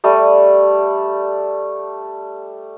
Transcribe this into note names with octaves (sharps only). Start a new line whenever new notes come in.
G3 A3 D#6